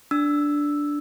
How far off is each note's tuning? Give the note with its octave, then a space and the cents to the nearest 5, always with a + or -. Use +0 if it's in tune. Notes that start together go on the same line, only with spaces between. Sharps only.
D4 -5 E6 +0